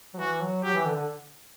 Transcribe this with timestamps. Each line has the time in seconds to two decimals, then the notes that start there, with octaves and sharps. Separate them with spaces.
0.14 F#3
0.19 E3 F#4
0.41 F#3
0.63 F#3 G4
0.74 E3
0.85 D3
0.95 D3